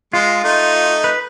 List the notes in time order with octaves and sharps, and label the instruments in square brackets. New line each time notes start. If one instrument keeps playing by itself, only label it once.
[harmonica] G#3 [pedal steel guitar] F4
[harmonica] A3 D#4
[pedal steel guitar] B4